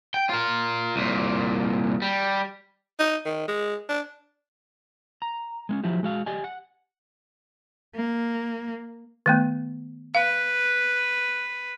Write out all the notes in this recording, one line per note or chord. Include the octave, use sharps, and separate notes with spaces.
G5
F4 A#4
C2 A#2
G3
D#4
D#3
G#3
D4
A#5
G#3 B3 C#4
F3 F#3 E4 G4
G#3 F#4 F5
G4 D5 D#5 G#5
F#5
A#3
D#3 A3 B3
B4 F5